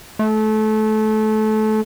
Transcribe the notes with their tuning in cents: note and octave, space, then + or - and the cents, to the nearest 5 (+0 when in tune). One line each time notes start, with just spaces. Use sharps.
A3 -25